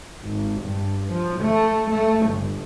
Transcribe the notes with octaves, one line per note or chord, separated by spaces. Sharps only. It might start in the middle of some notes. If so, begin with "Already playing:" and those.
G#1
G2
F3
A3
A3
G1